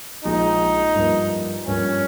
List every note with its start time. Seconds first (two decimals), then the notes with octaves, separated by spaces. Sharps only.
0.24 A#1 A#2 F3 G#3 D#4
0.95 G2 F3 A#3
1.67 G2 F3 A#3 C#4